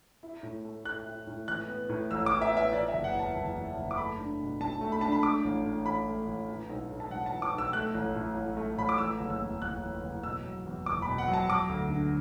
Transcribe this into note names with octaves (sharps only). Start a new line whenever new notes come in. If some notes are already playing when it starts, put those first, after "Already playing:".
E4
A2
A3
A2 F#6
E4
A2
E3 F#6
B3
A2
A1 E6
D6
E3
E5
B3 E5
E3 D5
E5
F#1
F#5
E2 A5
F#1
E3
F#1
D6
A3 B5
D4
B2
B1 A5
A3
B5
D4 A5
B5
A3 D6
A1
A2
A1 B5
A3
A1
E3
B1
A2
A5
B1 F#5
A5
E3
D6
B1
E6
A3 F#6
A1
A2
A1
A3
A1 B5
D6
E3 E6
F#1
E6
E2
F#1 F#6
E3
F#1
B2 E6
F#3
E2
F#1 D6
B5
B2
F#5
F#3
A5
F#3 D6
D2
D3